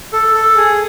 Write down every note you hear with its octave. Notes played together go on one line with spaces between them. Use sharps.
A4
A4
G#4